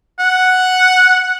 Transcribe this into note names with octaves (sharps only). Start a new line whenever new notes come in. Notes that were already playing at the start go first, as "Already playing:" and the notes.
F#5